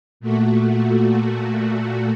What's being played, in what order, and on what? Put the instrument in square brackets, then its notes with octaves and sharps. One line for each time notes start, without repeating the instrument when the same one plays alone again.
[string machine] A#2 A3 F#4